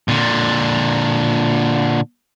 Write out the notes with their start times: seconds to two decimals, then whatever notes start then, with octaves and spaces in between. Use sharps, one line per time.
0.08 A#2 D3